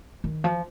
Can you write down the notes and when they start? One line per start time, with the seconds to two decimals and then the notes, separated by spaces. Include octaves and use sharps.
0.24 D#3
0.44 F3